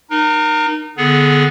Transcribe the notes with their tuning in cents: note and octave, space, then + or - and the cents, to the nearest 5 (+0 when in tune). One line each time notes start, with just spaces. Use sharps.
D#4 -30 A#4 +20
D3 +0 B3 +0 G#4 +15